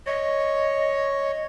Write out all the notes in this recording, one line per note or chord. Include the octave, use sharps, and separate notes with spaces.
C#5 D#5